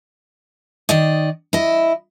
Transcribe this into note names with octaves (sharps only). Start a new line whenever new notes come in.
D#3 D5 D#5
E4 D#5